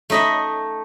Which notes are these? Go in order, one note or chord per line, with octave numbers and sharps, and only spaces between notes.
A3 D#4 D#5 E5 B5